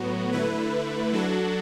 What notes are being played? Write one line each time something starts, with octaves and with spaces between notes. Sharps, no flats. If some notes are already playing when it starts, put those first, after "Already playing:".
Already playing: A2 F#3 B3 F#4
D3 A3 E4 B4
F#3 D4 F#4 A4